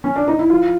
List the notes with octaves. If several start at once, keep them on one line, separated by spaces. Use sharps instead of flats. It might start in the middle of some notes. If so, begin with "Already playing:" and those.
C#4
D4
D#4
E4
F3 F4